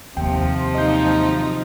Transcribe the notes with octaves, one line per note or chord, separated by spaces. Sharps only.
D#2 C3 F3 G5
F#3 D#4 F4 D#5 G6